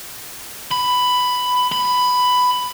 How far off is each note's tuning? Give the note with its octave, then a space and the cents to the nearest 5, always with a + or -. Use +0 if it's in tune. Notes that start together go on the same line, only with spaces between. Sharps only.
B5 +10
B5 +10